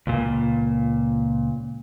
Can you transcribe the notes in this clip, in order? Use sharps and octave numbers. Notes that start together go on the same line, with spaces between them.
C#2 A#2